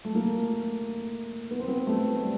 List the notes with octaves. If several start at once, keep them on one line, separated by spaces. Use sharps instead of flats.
A3
A#3
A3
B3
C4
B3
A3
G3